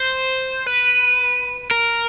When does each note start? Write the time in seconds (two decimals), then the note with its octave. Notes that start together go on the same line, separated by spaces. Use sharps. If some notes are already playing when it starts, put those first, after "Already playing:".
Already playing: C5
0.67 B4
1.71 A#4